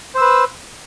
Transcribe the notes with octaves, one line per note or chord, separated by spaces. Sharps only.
B4 C5 E6